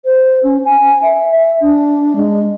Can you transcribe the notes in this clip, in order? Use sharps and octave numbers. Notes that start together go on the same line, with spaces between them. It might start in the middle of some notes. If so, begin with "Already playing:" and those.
C5
C#4
G#5
E5
E5
D4
G#3